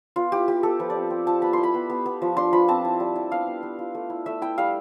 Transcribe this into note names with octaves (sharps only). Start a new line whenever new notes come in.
B3 F4
E4 G4
B3 G4
B3 A4
F3 B4
D5
C4
C4
F3 A5
B3 B5
E4 C6
B5
B3
B3
B3
F3
D4 C6
F3 B5
C4 A5
E4
G3
E4
B3 F5
B3
B3
F4
A3
E4
A3 E5
E4 G5
G3 F5